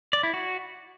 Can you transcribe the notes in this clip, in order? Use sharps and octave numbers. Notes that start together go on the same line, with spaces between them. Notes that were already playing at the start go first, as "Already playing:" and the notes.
D5
E4
F#4